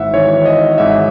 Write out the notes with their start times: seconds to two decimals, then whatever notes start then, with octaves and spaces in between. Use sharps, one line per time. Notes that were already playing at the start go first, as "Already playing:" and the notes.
Already playing: G#1 G#2 E3 E5 F#5
0.13 G#1 G#2 E3 C#5
0.46 D#5
0.78 G#1 G#2 E3 E5